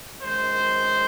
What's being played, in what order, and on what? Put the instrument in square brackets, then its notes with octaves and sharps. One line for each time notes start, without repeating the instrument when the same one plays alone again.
[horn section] F#2 D#3 G#3 C5